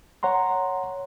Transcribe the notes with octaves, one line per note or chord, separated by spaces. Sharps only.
C#5 F#5 A#5 C6